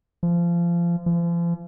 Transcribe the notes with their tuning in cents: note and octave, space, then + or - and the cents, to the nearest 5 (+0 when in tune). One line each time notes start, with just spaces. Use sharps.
F3 -25
F3 -40